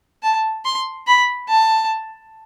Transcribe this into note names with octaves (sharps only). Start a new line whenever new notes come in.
A5
C6
B5
A5